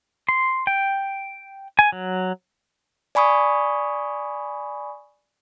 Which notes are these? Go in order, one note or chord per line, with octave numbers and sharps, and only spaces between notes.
C6
G5
G#5
F#3
D5 G#5 B5 C#6 D#6